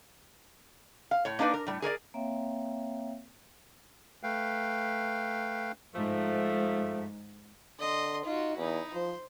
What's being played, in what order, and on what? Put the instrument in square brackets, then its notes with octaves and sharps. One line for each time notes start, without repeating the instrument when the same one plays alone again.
[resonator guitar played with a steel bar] F5
A2 C#5
A#3 D4 D#4 B4 D5
A#4
A2 G3
G#4 A#4 C#5 D5
[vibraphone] A#3 C4 C#5 E5 F5 G5
[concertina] A3 B4 F5 G5
[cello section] G#2 [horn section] F3 A3
[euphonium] D3 [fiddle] D#5 C6
[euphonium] D#4 [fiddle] F4 F#4
[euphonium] E2 [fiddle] D#4 E4
[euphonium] F3 [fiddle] C5